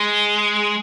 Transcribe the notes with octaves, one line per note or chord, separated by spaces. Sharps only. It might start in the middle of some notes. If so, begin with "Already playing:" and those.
Already playing: G#3